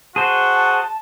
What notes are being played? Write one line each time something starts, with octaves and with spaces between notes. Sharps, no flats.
F#4 G#4 C5 A5